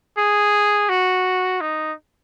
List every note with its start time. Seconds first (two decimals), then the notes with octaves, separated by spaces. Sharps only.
0.18 G#4
0.89 F#4
1.61 D#4